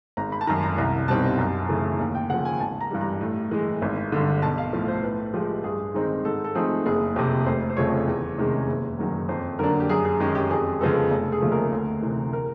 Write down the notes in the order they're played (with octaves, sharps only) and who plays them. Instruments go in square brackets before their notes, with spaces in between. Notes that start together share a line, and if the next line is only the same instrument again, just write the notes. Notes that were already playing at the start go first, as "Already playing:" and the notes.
[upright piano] G#1 A#5
B5
A5
F#2 D#3 A#5
A#5
C2 A#5
B2 G3 C4 D#4 A5
F#2
C#3 E3 A3
D#2
G5
C#3 F3 F#5
G#5
G#1 A5
A#5
G2 E3 G3
A#5
A2
E3 G#3
G#1
G2 D3
B1 A5
F5
A2 F3
C5
A2 B4
F3 G#3 G4
G2 G#4
D#3 G#3 C4 D#4
G#2 A4
A4
F3 A3 C4 D#4 G#4
F#1 G#4
F2 C3 G4
F1 C5
C5
F2 C#3 F3 A3 C#5
E2
C3 D#3 G#3 C#4
F#1
F#2 D#3 F#3
F2 C5
D3 F#3 A#3 D4 A#4
G4
F#2 G#4
G#4
D#3 G#3 C#4 G4
G4
F2 G#4
C#3 F3 G#3 B3 A4
F1 A4
G#4
D#2 C#3 F3 A3
A#4
D2
C3 E3
A#4